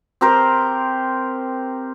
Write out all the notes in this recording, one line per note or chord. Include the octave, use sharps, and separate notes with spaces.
C4 G4 A#4 C5